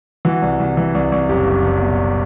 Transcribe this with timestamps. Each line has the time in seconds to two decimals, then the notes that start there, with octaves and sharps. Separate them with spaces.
0.25 E3 F#4
0.42 C2
0.60 C2
0.77 E3
0.95 C2
1.12 C2
1.29 F#1 G4
1.47 F#1
1.64 F#1
1.82 B2